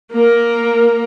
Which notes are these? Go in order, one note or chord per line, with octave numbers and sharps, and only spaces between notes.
A#3 A#4